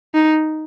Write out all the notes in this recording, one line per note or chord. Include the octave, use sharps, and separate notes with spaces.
D#4